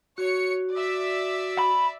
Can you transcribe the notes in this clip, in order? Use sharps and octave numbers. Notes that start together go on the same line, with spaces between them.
F#4 C#5 C#7
D5 E5
B5